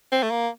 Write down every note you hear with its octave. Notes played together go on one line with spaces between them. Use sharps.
C4
A3
A#3